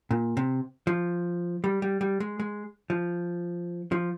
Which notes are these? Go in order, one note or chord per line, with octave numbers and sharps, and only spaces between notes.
A#2
C3
F3
G3
G3
G3
G#3
G#3
F3
F3